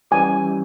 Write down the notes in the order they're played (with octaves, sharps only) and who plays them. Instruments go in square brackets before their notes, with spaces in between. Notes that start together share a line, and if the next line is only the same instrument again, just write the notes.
[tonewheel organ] E3 G3 C#4 E4 G4 [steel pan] G#5